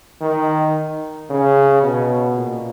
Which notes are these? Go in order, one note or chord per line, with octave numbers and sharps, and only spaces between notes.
D#3
C#3
B2
A#2